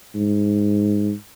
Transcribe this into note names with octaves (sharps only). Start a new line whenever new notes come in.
G#2